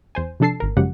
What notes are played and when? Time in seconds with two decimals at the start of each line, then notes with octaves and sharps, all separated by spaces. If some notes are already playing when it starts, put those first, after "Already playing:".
0.15 E2 C5 G#5
0.40 C3 F3 D4 A4 A5 C7
0.60 G#1 A#4
0.77 F#2 C#3 F3 G#3 G4 F#5